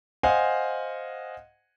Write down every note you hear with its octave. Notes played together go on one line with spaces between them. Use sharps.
C5 D#5 F5 F#5 G#5